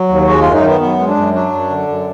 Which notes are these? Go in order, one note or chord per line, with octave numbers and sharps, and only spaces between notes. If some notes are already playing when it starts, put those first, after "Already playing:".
Already playing: F#3
D#2
G#3 F#4
F#2 F4
D#4
D#3 B3
F#2 B3
G#3
D4
F#2
F#3 D4
F#2
D3
F#2